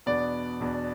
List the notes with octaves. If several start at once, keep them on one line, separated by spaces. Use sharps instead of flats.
E2 B2 B3 D4 D5
E2 B2 B3 D4